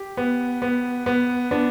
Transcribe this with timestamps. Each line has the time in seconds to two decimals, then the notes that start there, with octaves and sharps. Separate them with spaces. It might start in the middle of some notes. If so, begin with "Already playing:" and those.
Already playing: G4
0.17 B3
0.62 B3
1.06 B3
1.51 B3 D4